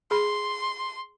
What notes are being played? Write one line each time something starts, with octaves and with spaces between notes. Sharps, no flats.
G#4 B5 C6